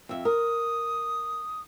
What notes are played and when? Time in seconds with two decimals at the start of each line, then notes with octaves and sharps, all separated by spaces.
0.09 F2 E5
0.25 A#4 D#6